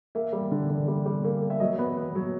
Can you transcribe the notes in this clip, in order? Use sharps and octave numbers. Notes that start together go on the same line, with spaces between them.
A#3 E5
G3
D3
D3
G3
G3
A#3
A#3
E5
F#3 D#5
B3
B3
F#3